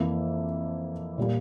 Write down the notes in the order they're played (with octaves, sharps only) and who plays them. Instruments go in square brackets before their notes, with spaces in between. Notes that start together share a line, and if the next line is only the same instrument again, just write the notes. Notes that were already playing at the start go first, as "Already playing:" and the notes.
Already playing: [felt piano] F2 E3 A#3 E5
A#2 G3 A#3